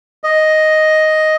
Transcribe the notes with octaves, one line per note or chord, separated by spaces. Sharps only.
D#5